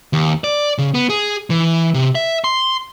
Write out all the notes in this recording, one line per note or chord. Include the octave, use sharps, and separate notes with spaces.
D#2
D5
C#3
B3
G#4
E3
C3
E5
C6